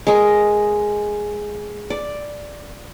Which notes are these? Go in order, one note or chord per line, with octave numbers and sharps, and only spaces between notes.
G#3 A#4 D#5
D5